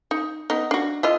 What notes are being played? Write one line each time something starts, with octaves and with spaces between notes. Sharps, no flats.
D#4
B3 D#4
D4 F#4
E4 F4 D#5